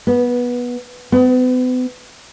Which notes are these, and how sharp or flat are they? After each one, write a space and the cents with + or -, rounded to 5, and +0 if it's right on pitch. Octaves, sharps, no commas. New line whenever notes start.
B3 -15
B3 +40